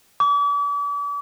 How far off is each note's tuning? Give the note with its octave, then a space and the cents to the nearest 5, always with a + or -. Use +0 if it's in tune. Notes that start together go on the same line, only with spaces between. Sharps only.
D6 -40